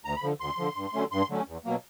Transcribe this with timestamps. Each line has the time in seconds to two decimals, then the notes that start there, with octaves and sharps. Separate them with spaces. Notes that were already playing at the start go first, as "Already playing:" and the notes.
0.05 D2 A#5
0.16 B5
0.23 D3 F3
0.40 D2 C6
0.58 D3 F3
0.76 G2
0.94 D3 F#3 A3 C#4
1.12 G2 C6
1.29 D3 F#3 A3 C#4
1.48 E2
1.65 B2 F#3 A#3